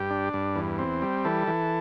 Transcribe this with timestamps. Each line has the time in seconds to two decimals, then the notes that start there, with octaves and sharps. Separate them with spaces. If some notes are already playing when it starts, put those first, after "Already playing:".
Already playing: G2 G4
0.10 D4
0.34 G2
0.56 E2
0.79 C4
1.02 G3
1.25 E3 A4
1.47 E3